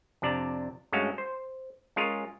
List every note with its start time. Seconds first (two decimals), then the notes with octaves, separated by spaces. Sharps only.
0.22 F2 C3 D4 D5 A5 A#5
0.92 G2 G#3 A3 C#4 F#4 F5
1.18 C5
1.96 G#3 C#4 F4 G#4 A#4 C#5